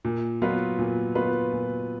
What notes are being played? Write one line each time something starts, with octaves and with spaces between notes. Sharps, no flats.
A#2
F#3 B3 F4 B4
A#2
F#3 B3 F4 B4
A#2